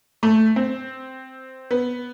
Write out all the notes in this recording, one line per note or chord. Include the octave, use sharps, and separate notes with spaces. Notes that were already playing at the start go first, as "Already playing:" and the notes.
A3
C4
B3